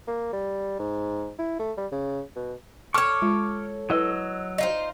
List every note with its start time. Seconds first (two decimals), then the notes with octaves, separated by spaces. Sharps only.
0.07 A#3
0.33 G3
0.79 G#2
1.39 E4
1.59 A3
1.77 G3
1.92 C#3
2.36 B2
2.94 A4 C#5 A5 C#6 D6 F6
3.22 G#3 F4
3.90 F#3 E4 B4 D#5 E6
4.58 D#4 F4 C5